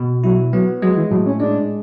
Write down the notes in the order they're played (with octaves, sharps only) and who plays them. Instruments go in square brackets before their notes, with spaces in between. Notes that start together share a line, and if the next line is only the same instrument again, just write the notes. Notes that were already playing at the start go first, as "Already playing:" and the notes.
Already playing: [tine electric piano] B2
[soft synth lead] F#3 [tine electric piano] E4
[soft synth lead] F#3 [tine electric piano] B3
[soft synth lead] F#3 [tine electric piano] G#3
[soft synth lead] E3
[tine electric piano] A2 [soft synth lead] F#3
[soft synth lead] C#4
[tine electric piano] G#3 [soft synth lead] D4